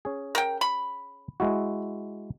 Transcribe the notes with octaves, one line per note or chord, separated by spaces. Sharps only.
C#4 G#4
A#4 G5
B5
G#3 E4 F#4